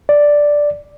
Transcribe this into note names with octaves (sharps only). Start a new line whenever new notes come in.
D5